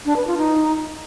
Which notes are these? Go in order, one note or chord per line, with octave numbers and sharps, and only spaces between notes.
D4
B4
F4
D#4